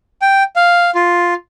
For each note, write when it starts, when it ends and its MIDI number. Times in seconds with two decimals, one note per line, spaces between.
0.22 0.43 79
0.56 0.91 77
0.95 1.34 65